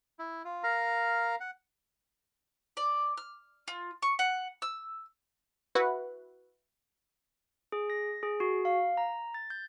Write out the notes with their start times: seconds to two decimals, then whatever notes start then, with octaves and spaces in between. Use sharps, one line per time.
0.19 E4
0.45 F4
0.63 A#4 F5 A#5
1.40 F#5
2.77 D5
3.17 F6
3.68 F4
4.02 C#6
4.19 F#5
4.62 E6
5.75 E4 F#4 B4 F#5
7.72 G#4
7.90 A#6
8.23 G#4
8.40 F#4
8.65 F5
8.97 A#5
9.34 A6
9.50 G6